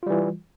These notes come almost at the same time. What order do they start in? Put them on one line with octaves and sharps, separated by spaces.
F4 G3 E3